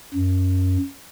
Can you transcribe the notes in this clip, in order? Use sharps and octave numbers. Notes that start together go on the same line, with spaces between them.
F#2